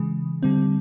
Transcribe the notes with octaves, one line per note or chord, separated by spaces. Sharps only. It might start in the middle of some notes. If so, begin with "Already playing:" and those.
Already playing: C#3 E3 G#3
D3 G3 C4